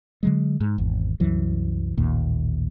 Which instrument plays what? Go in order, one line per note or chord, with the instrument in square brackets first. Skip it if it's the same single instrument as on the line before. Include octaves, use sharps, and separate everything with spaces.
[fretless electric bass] D3 F#3 G#3
G#2
G#1 E2
C2 F#2 E3 F#3
A1 D#2 A#2